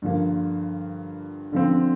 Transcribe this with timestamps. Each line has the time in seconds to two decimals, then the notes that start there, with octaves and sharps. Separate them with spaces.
0.02 G2 D3 F3 A#3
1.52 D3 F3 C4